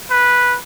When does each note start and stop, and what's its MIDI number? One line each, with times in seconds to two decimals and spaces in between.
0.11 0.57 71